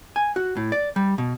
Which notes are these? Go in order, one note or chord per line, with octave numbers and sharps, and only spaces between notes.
G#5
F#4
A2
D5
G3
B2